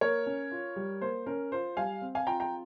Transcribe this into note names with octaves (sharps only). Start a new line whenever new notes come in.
A#3 A#4 C#5
C#4
F4
G3
A#3 C5
C#4 A#4
F4 C5
G3 F5 G#5
C4
F5 G#5
F4 G5 A#5
G5 A#5